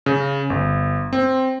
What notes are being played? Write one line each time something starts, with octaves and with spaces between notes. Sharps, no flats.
C#3
G1
C4